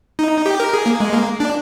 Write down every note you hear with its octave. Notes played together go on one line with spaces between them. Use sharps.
D#4
G4
A#4
G#4
A#3
G#3
A#3
D4